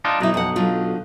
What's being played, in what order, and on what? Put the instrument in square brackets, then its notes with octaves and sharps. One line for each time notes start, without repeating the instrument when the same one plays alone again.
[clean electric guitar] D4 D#4 F4
[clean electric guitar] B1 D#4 [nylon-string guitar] F#3 E4
[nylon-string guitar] F2 F#5
D3 F#3 F4